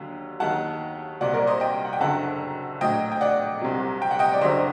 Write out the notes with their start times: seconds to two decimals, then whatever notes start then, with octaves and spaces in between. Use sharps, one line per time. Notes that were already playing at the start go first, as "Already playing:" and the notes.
Already playing: D#2 D3 F#3
0.40 D#2 D#3 F#3 F#5 A5
1.21 C2 A#2 F#3 D5 F#5
1.34 A#4 D5
1.47 C5 D#5
1.60 D#5 G5
1.85 F#5
1.93 G5
2.00 F#1 F#2 D3 F#3 F#5 A5
2.81 A#1 A2 F#3 D#5 G5
3.12 G5
3.21 D5 F#5
3.61 C2 C3 F#3
4.02 G5
4.11 F#5
4.19 D#5 G5
4.34 D5
4.41 F#1 F#2 D3 F#3 C5 D#5